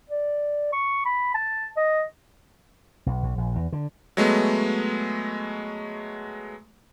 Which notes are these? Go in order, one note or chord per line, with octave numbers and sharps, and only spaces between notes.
D5
C#6
B5
A5
D#5
B1
B1
A#1
E2
D3
F#3 G#3 A3 B3